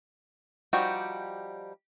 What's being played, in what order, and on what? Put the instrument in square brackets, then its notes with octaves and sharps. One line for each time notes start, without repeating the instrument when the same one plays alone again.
[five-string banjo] F3 G3 D#4 F#4 G4